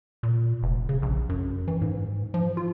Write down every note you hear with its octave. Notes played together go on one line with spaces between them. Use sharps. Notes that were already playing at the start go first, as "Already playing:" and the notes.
A#2
F1
C#3
A#1
F#2
E3
G#2
F3
F4